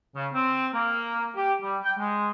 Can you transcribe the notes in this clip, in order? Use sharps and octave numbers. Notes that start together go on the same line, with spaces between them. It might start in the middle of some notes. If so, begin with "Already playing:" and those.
C#3
C4
A#3
G4
G3
G5
G#3